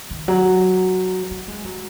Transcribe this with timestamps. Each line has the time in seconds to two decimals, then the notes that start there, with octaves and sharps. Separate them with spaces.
0.11 D#3
0.28 F#3
1.31 A#3
1.48 G#3
1.65 F#3